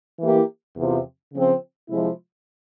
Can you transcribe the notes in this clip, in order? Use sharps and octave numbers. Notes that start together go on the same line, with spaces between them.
E3 A#3 E4 G4
E2 C3 F3
C#3 F3 C4
C3 F3 G#3 E4